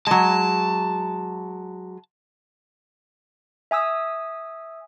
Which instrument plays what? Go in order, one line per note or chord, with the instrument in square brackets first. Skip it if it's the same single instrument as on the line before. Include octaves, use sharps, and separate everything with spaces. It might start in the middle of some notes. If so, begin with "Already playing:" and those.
[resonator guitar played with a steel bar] F#3 G#3 [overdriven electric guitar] A5
[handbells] E5 G#5 D#6 E6